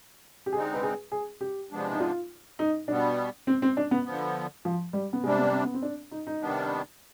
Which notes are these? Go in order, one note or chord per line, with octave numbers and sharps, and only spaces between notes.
G4
D3 G#3 C4 D#4 G#4
B4
G#4
G#4
G4
C3 F3 G#3 B3 D4
D#4
F4
D#4
B2 G3 B3 D4
C4
C4
D4
B3
D3 F3 B3
F3
G3
B3
C3 G3 G#3 D4
B3
C4
B3
C4
D4
D#4
D#4
C3 D#3 G3 B3 D4